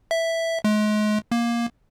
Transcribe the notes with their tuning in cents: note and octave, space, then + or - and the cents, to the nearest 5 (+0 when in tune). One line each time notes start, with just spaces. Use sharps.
E5 +0
G#3 +35
A#3 +15